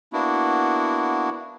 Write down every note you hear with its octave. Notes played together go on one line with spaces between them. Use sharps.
A#3 B3 D4 E4 F#4